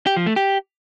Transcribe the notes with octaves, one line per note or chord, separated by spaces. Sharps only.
G4
F3
A3
G4